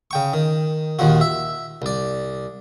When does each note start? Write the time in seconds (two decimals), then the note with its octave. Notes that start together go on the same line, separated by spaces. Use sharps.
0.11 C#3 G5 C#6
0.33 D#3
0.99 A#1 D#2 D#3 F3 F#4
1.21 E5
1.82 C2 D5